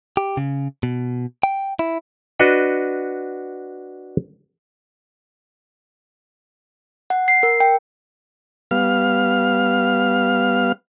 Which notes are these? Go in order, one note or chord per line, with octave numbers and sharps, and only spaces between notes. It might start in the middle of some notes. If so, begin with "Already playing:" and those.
G4
C#3
B2
G5
E4
D4 F#4 B4 D#5 F#5
F#5
C7
A#4
G5
G3 B3 F5 F6